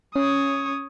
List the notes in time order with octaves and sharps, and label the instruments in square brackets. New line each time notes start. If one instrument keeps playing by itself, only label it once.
[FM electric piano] C#4 [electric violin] C#5 D#6